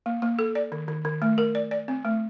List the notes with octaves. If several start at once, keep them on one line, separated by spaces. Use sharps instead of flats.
A#3
A#3
A4
D5
D#3
D#3
D#3
A3
A#4
D5
D5
C4
A3